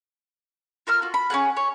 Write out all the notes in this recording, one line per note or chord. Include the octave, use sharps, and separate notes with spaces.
F4 A#4 E6 F6
F4 F#4
B5
C#4 F4 G#4 F#5
C#5